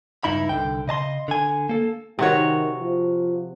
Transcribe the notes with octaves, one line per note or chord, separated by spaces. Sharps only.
C#2 G2 D#4 E4 B5
C2 D3 E3 G5
C#3 D#5 A5 C6
D3 G#5
A#3 A4
C3 D#3 F#4 C#5
F3